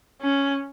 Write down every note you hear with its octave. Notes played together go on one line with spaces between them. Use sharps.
C#4